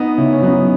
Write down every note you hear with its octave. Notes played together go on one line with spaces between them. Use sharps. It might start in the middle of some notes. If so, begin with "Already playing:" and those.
Already playing: B3 D#4
C#3 C#4 E4
C#4
F#3 B3 D#4